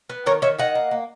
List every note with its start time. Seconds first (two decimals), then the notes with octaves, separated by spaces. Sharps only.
0.10 B3
0.26 D#3 A#4 C#5
0.42 D#3 C#5 E5
0.59 D#3 D#5 F#5
0.75 A#3
0.91 A#3